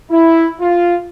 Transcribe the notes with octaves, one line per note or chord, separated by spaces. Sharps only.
E4
F4